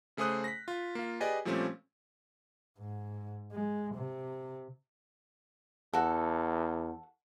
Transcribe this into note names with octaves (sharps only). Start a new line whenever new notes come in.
C#3 A3 G#4 C5 D#6 F#6
A#6 B6
F4
A#3 F4
G4 G#4 B4 D5 D#5 G#5
A#2 F3 G3 A3 C4 C#4
G#2
G#3
C3
E2 F#4 A4